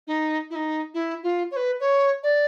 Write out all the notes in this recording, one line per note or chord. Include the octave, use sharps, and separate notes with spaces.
D#4
E4
D#4
E4
F4
C#5
B4
C#5
D5